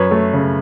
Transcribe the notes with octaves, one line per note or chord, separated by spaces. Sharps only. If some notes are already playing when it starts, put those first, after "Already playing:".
Already playing: F#2 B4 C#5
A3
C#3